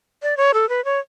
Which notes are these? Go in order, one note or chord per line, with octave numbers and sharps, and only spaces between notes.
D5
C#5
A4
B4
C#5